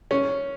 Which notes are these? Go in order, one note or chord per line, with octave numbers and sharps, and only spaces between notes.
C#4